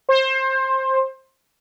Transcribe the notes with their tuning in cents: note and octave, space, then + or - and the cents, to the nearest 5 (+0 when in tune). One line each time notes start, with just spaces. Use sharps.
C5 +20